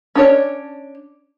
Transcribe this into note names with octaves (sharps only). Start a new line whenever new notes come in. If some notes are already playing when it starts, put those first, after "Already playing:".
C#4 D4 C#5